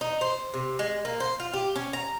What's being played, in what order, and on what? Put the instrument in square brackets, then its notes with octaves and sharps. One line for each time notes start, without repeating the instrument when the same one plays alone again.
[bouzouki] D#4
C5
C3
G#3
A#3
C5
F4
G4
C#4
A#5